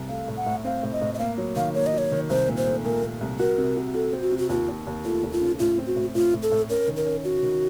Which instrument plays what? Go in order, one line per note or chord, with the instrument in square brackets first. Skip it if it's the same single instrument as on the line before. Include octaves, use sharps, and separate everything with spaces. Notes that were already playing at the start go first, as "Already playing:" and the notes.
Already playing: [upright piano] C2
[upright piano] A3 [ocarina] F5
[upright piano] A2
[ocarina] F#5
[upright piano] A2
[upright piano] C4 [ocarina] F5
[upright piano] A2
[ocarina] D#5
[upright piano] A2
[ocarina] D#5
[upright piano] A#3 [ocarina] F5
[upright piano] F#3
[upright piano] D#3 [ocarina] F5
[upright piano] A#3 [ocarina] C#5
[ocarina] D#5
[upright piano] F#3
[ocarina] C#5
[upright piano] D#3
[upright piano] C2 [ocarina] C5
[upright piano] A#2
[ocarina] C5
[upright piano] A3
[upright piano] A#2 [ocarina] A#4
[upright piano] A#2
C2
[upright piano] F#4 [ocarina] A#4
[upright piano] C3
F#4
[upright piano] F#4 [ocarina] A4
[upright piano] C4
[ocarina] F#4
[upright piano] C3
[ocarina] F#4
[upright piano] D#2 [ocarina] F4
[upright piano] D#2
D#2
[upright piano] A3 [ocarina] F4
[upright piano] D#2
[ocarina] F4
[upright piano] C#3
[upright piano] A2 [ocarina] F4
[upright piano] C4
[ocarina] F#4
[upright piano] A2
[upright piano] A2 [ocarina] F4
[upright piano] A2
[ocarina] A4
[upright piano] A2
[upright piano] C#4 [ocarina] A#4
[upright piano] D#3
[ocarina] A#4
[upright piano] C#4
[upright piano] C#4 [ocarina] F#4
[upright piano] D#3